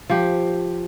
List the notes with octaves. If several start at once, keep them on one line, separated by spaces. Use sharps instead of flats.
F3 G4